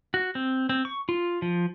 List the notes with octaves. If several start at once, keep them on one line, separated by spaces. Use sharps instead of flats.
F#4
C4
C4
C#6
F4
F3